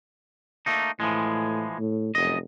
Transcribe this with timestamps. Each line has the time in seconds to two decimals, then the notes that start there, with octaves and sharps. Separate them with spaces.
0.66 A3 A#3 D#4
1.00 A2 E3 F3 G#3
1.79 A2
2.15 F1 F#2 D#5